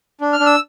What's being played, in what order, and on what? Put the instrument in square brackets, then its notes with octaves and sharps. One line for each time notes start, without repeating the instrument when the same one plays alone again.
[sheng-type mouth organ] D4
F6
D4
E6